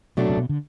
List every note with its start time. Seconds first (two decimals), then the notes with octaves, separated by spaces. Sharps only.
0.17 B2 F#3 A3 D4 F#4
0.30 C3
0.37 B2
0.49 D3